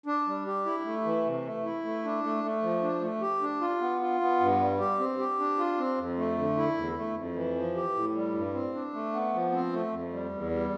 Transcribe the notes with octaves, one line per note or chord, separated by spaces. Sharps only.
D4
G3
G4
E4
A3
E3
C3
A3
E4
A3
D4
A3
A3
F3
D4
A3
G4
D4
F4
B3
F4
B3
G2
G3
G4
C4
G4
D4
F4
C4
F2
A3
D3
E4
E2
A3
F2
E3
F3
G4
A2
G3
G2
C4
D4
A3
B3
F3
C4
A3
F2
G3
E2
G3